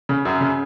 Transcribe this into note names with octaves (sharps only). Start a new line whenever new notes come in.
C#3
F#2
C#3